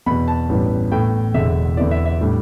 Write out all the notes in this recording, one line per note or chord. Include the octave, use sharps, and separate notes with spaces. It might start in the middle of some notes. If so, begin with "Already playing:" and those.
E2 B2 B3 B5
A5
A1 G2 E3 G3 B3
A2 E3 B3 G5
E1 E2 D3 E5
E2 D3 B3 E4 D5
E5
E5
A2 G3 D4